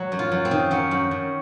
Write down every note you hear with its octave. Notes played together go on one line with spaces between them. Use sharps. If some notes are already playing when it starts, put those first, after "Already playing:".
Already playing: F#3
F#2
F4
F#2
C4
D#3
F#3 C#4
F#2
F#2